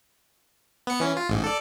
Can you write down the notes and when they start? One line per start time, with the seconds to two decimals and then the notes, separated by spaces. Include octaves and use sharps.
0.87 B3 C#7
1.00 E3 C#4
1.17 F4
1.29 A1 G#2
1.44 A4 D5